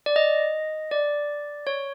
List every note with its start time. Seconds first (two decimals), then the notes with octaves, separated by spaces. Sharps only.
0.06 D5
0.16 D#5
0.91 D5
1.67 C#5